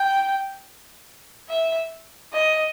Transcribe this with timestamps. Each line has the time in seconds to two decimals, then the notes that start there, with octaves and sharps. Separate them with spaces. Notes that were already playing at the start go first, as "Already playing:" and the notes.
Already playing: G5
1.49 E5
2.33 D#5